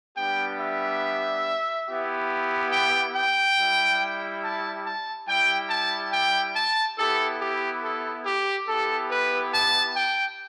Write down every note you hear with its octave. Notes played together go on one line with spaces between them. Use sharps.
G3 B3 D4 G4 G5
E5
B3 E4 G4
G5
G5
G3 E4 G4
A5
A5
G3 E4 G4 G5
A5
G5
A5
B3 E4 G4 A4
G4
A4
G4
B3 E4 G4 A4
B4
A5
G5